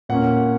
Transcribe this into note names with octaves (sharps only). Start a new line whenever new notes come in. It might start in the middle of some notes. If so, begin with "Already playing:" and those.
A#2 A#3 C#4 F#5